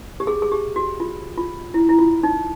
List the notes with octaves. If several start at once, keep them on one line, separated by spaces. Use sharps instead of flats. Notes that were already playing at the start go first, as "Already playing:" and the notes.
G4
G#4
G#4
G4
F#4
F4
F4
E4
E4
F4
D#4